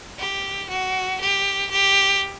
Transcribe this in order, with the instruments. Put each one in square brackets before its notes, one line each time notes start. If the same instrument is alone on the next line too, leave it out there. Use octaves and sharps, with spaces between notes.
[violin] G4
F#4
G4
G4